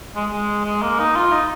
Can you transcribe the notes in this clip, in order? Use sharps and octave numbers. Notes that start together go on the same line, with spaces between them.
G#3
G#3
G#3
A#3
D#4
F4
D#4